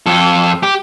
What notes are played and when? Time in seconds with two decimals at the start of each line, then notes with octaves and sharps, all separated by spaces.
0.06 F2 A4
0.63 G4